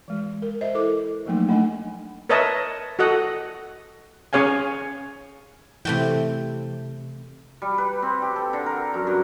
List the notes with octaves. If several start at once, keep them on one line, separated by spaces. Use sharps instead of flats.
E3 G#3
A#4
C5 D#5 E5
E4 A4 A#4 C5 D6
F3 F#3 A3 A#3 D#4
A3 D4 D#5 G#5
A#4 B4 C#5 D#5 E5 A5
F#4 A4 D#5 F#5
C#4 G#4 C#5 F5 G#5
C3 E3 A3 G5
G3
B4
C4
G4
A4
D3
A#4
F#2
G2